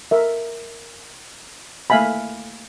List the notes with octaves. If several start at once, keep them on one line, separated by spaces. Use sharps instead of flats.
A#4 E5
A3 A#3 E5 F5 G#5 B5